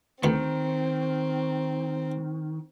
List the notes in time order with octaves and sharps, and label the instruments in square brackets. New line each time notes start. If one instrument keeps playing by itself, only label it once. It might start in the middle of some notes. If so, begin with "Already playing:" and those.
[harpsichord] D2 B3 [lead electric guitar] D#3 [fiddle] C4